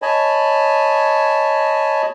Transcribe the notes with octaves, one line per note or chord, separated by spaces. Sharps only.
C#5 D#5 G#5 A5 B5